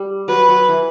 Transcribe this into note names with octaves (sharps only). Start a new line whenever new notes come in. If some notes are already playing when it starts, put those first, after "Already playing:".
Already playing: G3
F#3 B4
F#3
E3